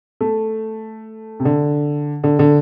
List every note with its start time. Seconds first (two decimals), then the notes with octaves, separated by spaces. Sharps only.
0.21 A3
1.40 C3
1.45 D3
2.24 D3
2.39 D3